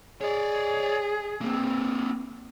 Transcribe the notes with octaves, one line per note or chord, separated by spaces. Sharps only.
G#4 C#5 D5
A#3 C4